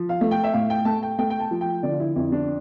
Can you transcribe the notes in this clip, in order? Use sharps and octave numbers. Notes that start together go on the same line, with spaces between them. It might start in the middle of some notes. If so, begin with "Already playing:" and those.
Already playing: F3
F5
A3
G5
E5
A2 F5
G5
A3 A5
G5
A3 G5
G5
A5
F3
G5
D3 D5
F4
E4
F2 E4
D4